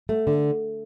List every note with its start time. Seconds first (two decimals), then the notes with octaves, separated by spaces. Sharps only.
0.09 A3
0.27 D3